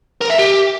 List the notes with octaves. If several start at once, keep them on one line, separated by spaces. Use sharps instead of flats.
A#4
E5
G4